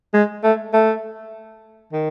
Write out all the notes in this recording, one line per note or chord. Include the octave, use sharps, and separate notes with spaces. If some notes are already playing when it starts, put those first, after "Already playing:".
G#3
A3
A3
D#3